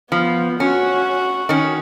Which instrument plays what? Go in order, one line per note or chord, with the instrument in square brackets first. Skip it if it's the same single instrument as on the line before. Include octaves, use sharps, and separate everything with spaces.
[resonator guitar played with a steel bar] F3 [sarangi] B3
[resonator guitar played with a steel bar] C#4 [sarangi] F#4
[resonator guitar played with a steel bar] D#3 C#4